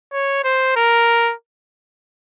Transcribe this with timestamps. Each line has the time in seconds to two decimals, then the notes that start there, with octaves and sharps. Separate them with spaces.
0.13 C#5
0.44 C5
0.76 A#4